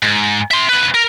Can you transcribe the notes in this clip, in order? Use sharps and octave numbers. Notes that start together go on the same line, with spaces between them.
G#2
E5 C6
D2 B4
A#4